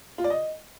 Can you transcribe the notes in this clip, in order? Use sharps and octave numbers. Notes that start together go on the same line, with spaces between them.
F4
D5
D#5